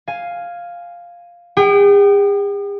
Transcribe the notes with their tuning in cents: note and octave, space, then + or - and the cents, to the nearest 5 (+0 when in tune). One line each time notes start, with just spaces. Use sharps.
F5 +0 G#5 +0
G#4 -45 G5 -30